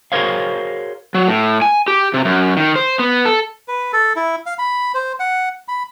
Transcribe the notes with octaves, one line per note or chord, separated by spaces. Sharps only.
F#4 G#4 A#4 C5 C#5 F5
F#3
A2
G#5
G4
C3
F#2
D#3
C5
B3
A4
B4
A4
E4
F5
B5
C5
F#5
B5